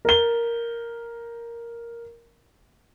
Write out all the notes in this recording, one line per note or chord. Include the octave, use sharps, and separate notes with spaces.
A#4 G7